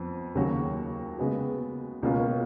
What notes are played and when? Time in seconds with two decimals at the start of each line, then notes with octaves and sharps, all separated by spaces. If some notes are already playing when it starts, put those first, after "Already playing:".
Already playing: F2 F3 B3
0.35 D#2 C#3 F#3 C#4 F#4
1.18 C#3 G#3 B3 F#4
2.03 C#2 B2 A#3 C#4 F4